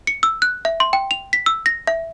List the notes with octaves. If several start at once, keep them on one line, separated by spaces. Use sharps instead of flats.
C#7
E6
F#6
E5
C6
G5
F7
B6
E6
A#6
E5